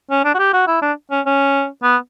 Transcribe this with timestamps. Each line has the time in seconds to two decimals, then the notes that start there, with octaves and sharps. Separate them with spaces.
0.10 C#4
0.25 D4
0.34 F#4
0.39 G4
0.53 F#4
0.67 E4
0.82 D4
1.11 C#4
1.26 C#4
1.83 B3